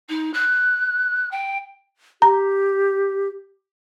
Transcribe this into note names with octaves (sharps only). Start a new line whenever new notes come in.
D#4
F#6
G5
G4 A#5